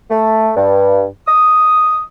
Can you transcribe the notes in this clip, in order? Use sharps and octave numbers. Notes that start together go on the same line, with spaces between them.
A3
G2
D#6